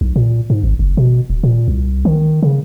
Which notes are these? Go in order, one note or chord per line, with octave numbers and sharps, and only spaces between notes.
B1
A#2
G#2
G#1
F#1
B2
D1
A#2
C2
D#3
C#3